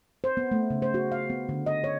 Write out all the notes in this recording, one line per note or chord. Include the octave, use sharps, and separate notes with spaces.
C5
B3
A3
C#3
C5
F#4
F5
B3
D3
D#5
C#5